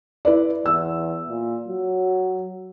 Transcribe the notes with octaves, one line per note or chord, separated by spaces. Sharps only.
E4 B4 D5
E2 E6
A#2
F#3